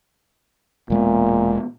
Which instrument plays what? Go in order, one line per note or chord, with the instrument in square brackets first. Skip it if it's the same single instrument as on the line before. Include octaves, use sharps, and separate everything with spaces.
[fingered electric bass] E1 G#3 B3 [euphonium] A#2